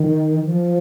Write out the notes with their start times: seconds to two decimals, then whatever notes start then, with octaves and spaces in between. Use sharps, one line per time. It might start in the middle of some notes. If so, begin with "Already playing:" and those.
Already playing: D#3
0.45 F3